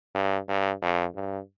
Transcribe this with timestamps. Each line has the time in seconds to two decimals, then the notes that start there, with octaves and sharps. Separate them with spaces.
0.15 G2
0.48 G2
0.82 F2
1.15 G2